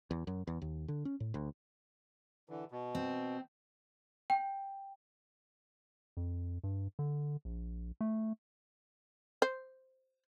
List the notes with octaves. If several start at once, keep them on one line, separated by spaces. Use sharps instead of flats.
E2
F#2
E2
D#2
D3
C#4
A2
D2
D3 E3
B2
C4
G5
F2
G2
D3
A#1
A3
C5